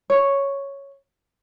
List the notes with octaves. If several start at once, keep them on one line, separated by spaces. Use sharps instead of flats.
C#5